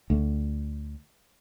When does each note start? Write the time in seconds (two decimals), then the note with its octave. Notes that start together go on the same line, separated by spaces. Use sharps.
0.10 D2